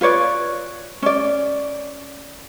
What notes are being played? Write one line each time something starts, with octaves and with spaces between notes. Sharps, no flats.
F4 B4 C#5 D5
C#4 D5